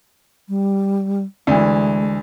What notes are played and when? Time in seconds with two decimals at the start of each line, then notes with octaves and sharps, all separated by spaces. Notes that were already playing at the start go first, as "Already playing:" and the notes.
0.49 G3
1.47 D2 E3 G#3